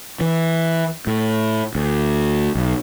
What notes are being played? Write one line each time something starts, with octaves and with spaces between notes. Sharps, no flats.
E3
A2
D2
B1